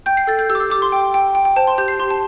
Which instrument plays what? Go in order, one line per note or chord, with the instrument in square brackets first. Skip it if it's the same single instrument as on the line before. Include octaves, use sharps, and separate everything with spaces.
[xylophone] G5 G6
C7
A4 A6
G6
G4 E6
D6
E6
G4 D6
C6
G5
G5
G5
G5
C5 A5
C6
G4 G6
C7
G4 C6
A5